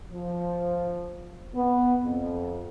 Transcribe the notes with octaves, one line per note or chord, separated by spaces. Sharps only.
F3
B3
F2